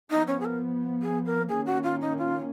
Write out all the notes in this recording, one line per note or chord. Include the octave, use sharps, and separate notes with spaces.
F3 B3 D#4
C#4
G#4
A#4
G#4
A#4
D#3 A#3 C#4 G#4
F#4
F4
D#4
F4